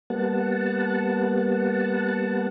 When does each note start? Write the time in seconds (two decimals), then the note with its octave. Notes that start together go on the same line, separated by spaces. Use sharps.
0.10 G3 A#3 B3 F#5 A5